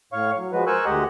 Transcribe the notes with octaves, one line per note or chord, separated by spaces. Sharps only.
A2 C#5 F5 C#6
F#3
F3 G#3 F#4 B4
A#4 C5 G#5 C#6 E6 F#6
D2 G#3 G4 D#5 F#5